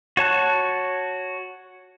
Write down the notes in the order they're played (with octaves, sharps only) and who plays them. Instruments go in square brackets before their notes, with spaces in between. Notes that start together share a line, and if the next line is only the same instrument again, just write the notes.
[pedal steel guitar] F#4 C#5 A5 F#6